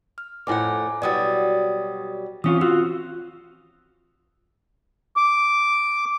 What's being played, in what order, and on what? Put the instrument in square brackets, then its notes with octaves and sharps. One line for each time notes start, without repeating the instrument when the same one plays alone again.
[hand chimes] F6
[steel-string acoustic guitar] F2 A2 F#5 [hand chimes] E4 G#5 D6
[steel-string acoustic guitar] B2 F#3 G3 [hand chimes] D5 D#6 A6
[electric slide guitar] E3 C#4 F4 [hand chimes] C4 D#6
[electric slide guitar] F4 F#4 [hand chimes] E6
[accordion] D6